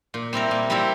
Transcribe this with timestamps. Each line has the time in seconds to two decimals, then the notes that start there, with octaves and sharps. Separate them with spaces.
0.14 A#2
0.33 G3 C4 E4 A#4
0.51 A#2
0.70 G3 C4 E4 A#4